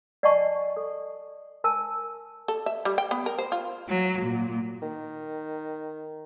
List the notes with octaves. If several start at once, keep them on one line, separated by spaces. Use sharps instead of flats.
D5 D#5 F#5 G#5 A5 C#6
A4
A#4 G#5 A5 E6
A4
E5
G3
G5
B3
A#4
C5
F4
F#3
A#2
D#3